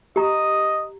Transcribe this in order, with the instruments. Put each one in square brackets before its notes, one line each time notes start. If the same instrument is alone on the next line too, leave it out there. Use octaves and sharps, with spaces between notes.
[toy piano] G4 A#5 [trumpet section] D#5